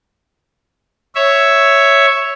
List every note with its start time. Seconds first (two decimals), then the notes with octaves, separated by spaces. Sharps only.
1.15 C#5 E5